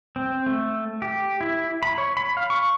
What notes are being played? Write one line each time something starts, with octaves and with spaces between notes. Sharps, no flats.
C4
A3
G4
E4
B5
C#5
B5
F5
C#6